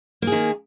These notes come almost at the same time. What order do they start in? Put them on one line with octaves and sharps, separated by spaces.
A#3 G#4 D#3